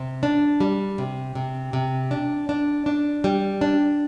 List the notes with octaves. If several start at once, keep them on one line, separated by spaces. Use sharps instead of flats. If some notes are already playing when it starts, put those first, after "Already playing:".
Already playing: C3
D4
G3
C3
C3
C3
D4
D4
D4
G3
D4